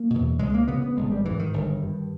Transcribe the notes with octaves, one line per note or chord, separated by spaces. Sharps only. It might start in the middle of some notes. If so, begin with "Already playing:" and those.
Already playing: A#3
E2 B2
C#2 G#3
A#3
C#3 B3
B3
G#1 G#3
G3
G#2 E3
D#3
G1
G2